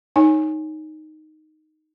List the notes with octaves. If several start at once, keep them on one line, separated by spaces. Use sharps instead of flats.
D#4 C#5 G#5